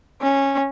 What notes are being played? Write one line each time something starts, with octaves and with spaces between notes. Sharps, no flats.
C#4